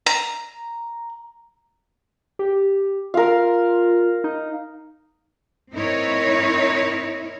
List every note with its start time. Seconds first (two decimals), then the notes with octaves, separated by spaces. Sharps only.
0.06 A#5
2.39 G4
3.14 F4 A#4 F5
4.24 D#4
5.73 C4 D#4 E4 A#4 C#5